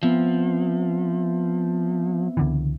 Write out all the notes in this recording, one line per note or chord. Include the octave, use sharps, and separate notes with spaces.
F3 B3 C4 E5
C#2 D3 E3